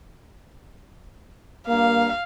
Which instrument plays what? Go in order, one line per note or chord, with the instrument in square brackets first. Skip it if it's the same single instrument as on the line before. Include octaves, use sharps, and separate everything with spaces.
[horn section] G2 A#3 [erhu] F5